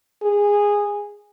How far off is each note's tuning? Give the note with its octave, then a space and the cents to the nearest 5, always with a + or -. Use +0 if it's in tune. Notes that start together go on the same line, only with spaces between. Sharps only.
G#4 -15